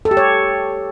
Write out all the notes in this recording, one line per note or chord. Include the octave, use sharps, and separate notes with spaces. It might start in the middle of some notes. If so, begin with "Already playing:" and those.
A4
G4
C#5